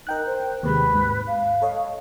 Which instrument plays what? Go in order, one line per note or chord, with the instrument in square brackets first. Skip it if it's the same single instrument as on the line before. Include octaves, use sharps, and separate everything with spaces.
[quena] D#4 [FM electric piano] A#4 G5 F#6
[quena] C5
[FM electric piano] D#2 C3 G#3 [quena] B4
[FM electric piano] G#2
[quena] F5
[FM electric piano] A4 C#5 D#5